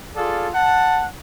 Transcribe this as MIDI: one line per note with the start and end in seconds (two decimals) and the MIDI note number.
0.16 0.49 65
0.16 0.49 68
0.16 0.49 69
0.16 0.49 74
0.16 0.49 77
0.54 1.05 78
0.54 1.05 81